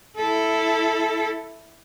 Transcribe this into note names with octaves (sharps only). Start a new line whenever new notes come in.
E4 A4